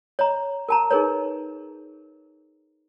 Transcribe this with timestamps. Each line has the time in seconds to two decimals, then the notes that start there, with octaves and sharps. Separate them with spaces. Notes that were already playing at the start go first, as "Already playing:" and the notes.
0.19 C#5 D#5 A#5
0.69 A#4 A5 A#5
0.91 D#4 G#4 A#4 B4 C#5